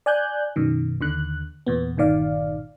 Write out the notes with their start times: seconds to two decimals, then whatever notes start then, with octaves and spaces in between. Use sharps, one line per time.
0.06 D5 G#5 F#6 G6
0.56 F#2 B2 D#3
1.01 D#2 D3 F#6
1.67 E2 A#2 B3
1.97 G1 A#2 D#3 D5 F5